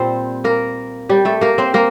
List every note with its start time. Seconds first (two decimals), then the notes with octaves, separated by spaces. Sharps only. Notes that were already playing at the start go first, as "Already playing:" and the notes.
Already playing: A#2 G3 C4 C5
0.44 A#3 A#4
1.09 G3 G4
1.25 A3 A4
1.41 A#3 A#4
1.58 C4 C5
1.74 A#3 A#4